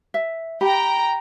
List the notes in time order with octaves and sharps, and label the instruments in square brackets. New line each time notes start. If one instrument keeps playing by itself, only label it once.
[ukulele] E5
[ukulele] G4 B5 [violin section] G5 A#5